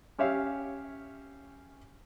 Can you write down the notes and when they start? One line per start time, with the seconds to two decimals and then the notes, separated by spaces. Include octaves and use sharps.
0.19 C#4 G4 C#5 E5 F5